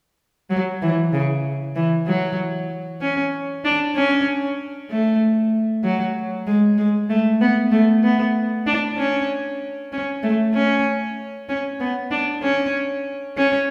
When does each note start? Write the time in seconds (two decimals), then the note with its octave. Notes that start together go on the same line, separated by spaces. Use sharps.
0.50 F#3
0.82 E3
1.13 C#3
1.76 E3
2.07 F#3
3.02 C#4
3.65 D4
3.95 C#4
4.90 A3
5.84 F#3
6.47 G#3
6.78 G#3
7.10 A3
7.41 B3
7.72 A3
8.03 B3
8.67 D4
8.97 C#4
9.92 C#4
10.23 A3
10.54 C#4
11.49 C#4
11.80 B3
12.11 D4
12.42 C#4
13.37 C#4